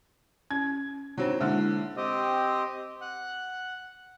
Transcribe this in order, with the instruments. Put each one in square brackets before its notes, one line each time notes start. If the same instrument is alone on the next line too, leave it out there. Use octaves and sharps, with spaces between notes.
[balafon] C#4 [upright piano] G#6
[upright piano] F#3 C4 [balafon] D4 D#4
[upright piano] D3 [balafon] G#3 A#3 E4
[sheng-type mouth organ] C4 G4 D#5
F#5